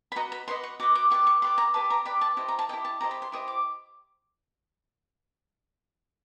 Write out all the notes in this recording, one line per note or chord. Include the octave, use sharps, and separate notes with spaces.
B5
F#4 B4 D#5 A#5
B5
F#4 B4 D#5 C6
C#6
F#4 B4 D#5 D6
D6
G4 B4 D5 C#6
C#6
G4 B4 D5 C6
A#5
G4 B4 D5 A5
A#5
G4 B4 D5 B5
A5
E4 G4 C5 D#5
A#5
A5
E4 G4 C5 D#5 G5
A5
E4 G4 C5 D#5 A#5
B5
C6
E4 G4 C5 D#5 D#6
D6